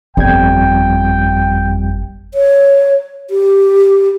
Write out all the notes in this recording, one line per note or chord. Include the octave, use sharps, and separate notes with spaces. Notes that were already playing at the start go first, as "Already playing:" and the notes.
G1 F2 G3 G5 G#6
C#5
G4